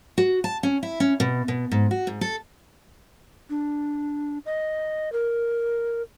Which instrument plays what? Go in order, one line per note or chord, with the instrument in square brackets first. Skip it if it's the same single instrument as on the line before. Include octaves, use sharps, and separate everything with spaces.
[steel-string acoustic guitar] F#4
A5
C#4
E4
C#4
B2
B2
G#2
F#4
G#2
A4
[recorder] D4
D#5
A#4